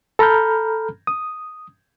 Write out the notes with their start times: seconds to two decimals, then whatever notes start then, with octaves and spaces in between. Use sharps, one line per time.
0.19 A4 A#5 B5 F6 G6
1.07 D#6